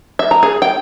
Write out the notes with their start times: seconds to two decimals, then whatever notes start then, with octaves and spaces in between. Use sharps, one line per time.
0.19 E5
0.31 A#5
0.43 G#4
0.62 G5